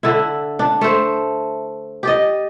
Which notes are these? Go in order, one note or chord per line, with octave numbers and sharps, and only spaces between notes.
D3 E4
D4
A3 C5
G4 D5 D#5